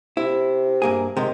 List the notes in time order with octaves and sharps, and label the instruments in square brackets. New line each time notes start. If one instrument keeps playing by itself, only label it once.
[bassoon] C3 [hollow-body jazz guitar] E4
[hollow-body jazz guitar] G2 A#3 G#4
[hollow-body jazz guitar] C3 G#3 [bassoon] D#3